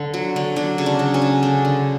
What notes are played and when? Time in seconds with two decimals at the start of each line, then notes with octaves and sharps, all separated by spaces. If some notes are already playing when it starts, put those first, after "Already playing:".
Already playing: D3
0.14 F#3
0.36 D3
0.56 F#3 D4
0.78 C#3
0.86 D4
0.99 F#3
1.14 C#4
1.22 C#3
1.43 D3 D4
1.65 D3